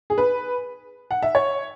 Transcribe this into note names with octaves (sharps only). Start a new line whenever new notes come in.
G#4
B4
F#5
E5
C#5